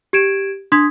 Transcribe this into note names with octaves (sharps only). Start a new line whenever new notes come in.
G4 G#6 D7 E7
D4 C6 D#6 G#6 B6